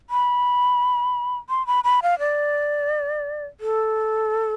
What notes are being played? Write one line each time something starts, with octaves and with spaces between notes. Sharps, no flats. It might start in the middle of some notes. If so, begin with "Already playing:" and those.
B5
C6
B5
B5
F5
D5
A4